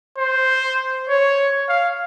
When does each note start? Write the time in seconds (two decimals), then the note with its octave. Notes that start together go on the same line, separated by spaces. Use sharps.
0.18 C5
1.09 C#5
1.69 F5